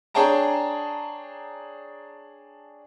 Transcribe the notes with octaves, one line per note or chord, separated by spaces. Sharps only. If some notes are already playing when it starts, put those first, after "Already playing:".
D4 G#4 C#5 G5 A5 A#5